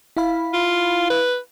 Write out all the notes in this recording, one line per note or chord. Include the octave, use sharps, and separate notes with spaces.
E4 F5 B5
F4
B4